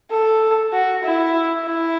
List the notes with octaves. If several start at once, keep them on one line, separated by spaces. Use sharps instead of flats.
A4
F#4
E4
E4